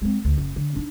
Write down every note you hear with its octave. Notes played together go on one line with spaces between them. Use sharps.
G#3 C4
D2
F#1
D3
D4 D#4